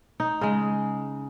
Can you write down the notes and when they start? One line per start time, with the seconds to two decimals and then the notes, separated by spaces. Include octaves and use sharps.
0.20 D#4
0.41 C#3 G#3